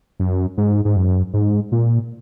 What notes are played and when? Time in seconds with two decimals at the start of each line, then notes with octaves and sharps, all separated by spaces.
0.20 F#2
0.58 G#2
0.85 G#2
0.96 F#2
1.33 G#2
1.72 A#2